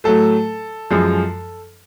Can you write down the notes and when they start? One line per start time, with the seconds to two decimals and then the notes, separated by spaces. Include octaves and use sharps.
0.04 A2 F#3 A3 A4
0.90 F#2 F3 G#3